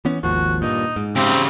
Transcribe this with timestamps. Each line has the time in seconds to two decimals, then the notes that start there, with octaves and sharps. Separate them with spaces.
0.05 E3 B3 C#4
0.23 G#1 D#2 F3 F#4
0.62 G2 A#2 D#4
0.96 G#2
1.16 C#3 C4 G4